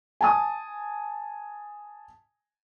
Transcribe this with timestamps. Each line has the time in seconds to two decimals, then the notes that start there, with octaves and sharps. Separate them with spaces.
0.21 G#5 A5 D#6